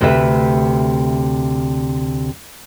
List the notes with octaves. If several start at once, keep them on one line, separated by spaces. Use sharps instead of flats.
D2 C3 B4 E5